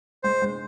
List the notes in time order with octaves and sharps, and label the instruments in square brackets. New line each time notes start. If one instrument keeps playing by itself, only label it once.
[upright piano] G#3 [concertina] C5
[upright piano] G#3